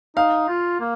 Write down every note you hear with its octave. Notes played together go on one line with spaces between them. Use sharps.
D#4 F5
F4
A#3